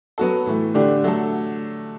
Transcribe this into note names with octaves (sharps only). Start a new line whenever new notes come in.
F#3 B3 F#4 A4
A2 E3 A3
D3 A3 D4 G4
F#3 A3 D4 A4